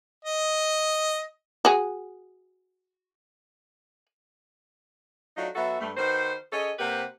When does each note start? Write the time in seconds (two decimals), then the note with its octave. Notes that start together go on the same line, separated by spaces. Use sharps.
0.25 D#5
1.65 F#4 G#4
5.37 F#3 A3 D4 D#4 F4 F#4
5.56 F#3 B3 F#4 A4 E5
5.80 G2 A3
5.97 D#3 F#4 B4 C5
6.53 C#4 G#4 A4 C#5 D#5
6.79 C3 A#3 G4 B4 C5 F#5